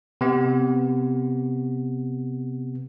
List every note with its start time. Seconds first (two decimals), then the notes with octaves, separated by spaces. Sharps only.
0.21 C3 B3